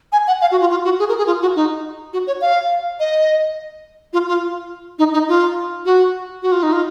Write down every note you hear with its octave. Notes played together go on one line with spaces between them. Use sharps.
G#5
F#5
F5
F#4
F4
F4
F#4
G#4
A#4
G#4
F4
F#4
D#4
F#4
C#5
F5
D#5
F4
F4
D#4
D#4
F4
F#4
F#4
F4
D#4
F4